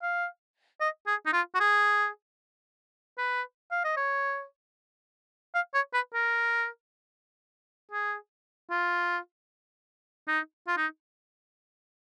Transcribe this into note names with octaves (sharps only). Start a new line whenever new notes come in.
F5
D#5
G#4
D#4
F4
F#4
G#4
B4
F5
D#5
C#5
F5
C#5
B4
A#4
G#4
F4
D#4
F4
D#4